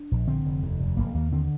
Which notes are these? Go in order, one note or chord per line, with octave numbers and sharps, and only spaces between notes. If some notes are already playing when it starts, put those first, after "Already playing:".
Already playing: D4
A#1
D3 C4
F1
D#2
F1
F1 A#3
D#2 A#3
D3 C4